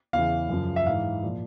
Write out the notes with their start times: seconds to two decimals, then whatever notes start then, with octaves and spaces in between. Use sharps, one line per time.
0.13 E2 C#3 E3 F5
0.49 F#2 C#3 F3
0.76 E5
0.86 G#2 E3 F5
1.23 A#2 F3